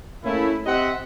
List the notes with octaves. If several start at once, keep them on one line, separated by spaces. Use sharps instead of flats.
A3 A#3 C#4 E4
C4 G4 D#5 E5 F#5